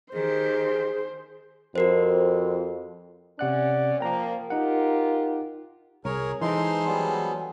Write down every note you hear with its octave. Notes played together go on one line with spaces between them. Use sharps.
D#3 G4 G#4 C5
F2 F#4 A#4 C5
C3 C#4 D5 F#5 F#6
F3 A#3 G5 A#5
D#4 F4 G4 A#4 F#5
C2 G#4 A#4 C#5
E3 G#3 D#4 A4 C5 G#5 C6
F#3 G3 B3